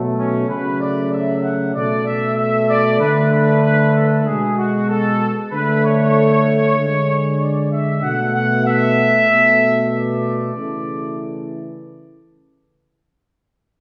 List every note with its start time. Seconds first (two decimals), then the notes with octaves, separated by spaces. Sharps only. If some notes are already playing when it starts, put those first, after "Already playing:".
Already playing: B2 F#3 A3
0.17 C#4
0.49 C#3 F#3 A3 B4
0.80 D5
1.12 E5
1.43 F#5
1.74 B2 A3 D5
2.06 E5
2.37 E5
2.69 D5
3.00 D3 A3 B4
3.32 B4
3.63 B4
3.94 A4
4.25 B2 G#3 G#4
4.57 F#4
4.89 A4
5.51 D3 A3 B4
5.83 C#5
6.77 D3 G#3
7.40 D5
7.72 E5
8.03 B2 A3 F#5
8.35 F#5
8.65 E5
9.29 B2 A3
9.92 D5
10.54 C#3 E3 A3